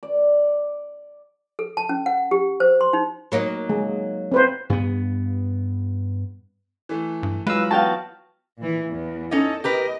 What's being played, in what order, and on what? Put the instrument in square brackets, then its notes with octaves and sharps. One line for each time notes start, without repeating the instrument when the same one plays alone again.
[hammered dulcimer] D5
[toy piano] A4
A5
C#4
F#5
G4
C5
C6
D#4
[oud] F#3 A#3 D#4
[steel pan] G#3
C4 B4 C5
[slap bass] G2 B3
[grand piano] E3 A3
[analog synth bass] G2
[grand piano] E3 F#3 F4 [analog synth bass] G#3 [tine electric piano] B4 F5 E6
[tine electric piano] B3 F#4 [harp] F5 G5 A5
[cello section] A#2 E3
E2
[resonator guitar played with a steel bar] C#4 D#4 D#5 [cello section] A4
[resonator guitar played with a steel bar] G4 A#4 B4 [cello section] D#5